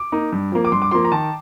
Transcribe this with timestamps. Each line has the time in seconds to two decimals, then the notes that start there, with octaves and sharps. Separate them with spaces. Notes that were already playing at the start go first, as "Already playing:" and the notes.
Already playing: D6
0.12 A#3 D#4
0.32 G2
0.52 F3 A#3
0.65 D6
0.72 G2 C6
0.82 D6
0.91 F3 A#3 C6
1.05 A#5
1.12 D#3 A5